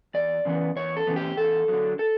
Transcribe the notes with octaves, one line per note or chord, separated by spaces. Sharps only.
E2 D5
C#3 E3 B3
E2 C#5
A4
C#3 E3 B3
G4
E2 A4
D3 F#3
A4